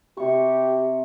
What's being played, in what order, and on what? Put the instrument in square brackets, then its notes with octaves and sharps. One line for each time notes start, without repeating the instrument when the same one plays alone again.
[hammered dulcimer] C3 C#6 [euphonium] G4